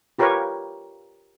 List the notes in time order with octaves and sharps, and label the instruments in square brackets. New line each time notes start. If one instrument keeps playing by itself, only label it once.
[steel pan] F4 G4 A#4 B4 C#5